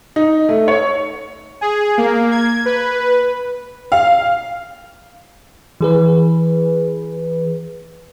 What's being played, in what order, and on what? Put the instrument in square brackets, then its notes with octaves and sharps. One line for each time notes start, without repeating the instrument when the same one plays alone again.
[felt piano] D#4
A3
C#5
[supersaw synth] G#4
A#3
G#6
B4
[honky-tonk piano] F5
[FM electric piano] E3 G#4 B4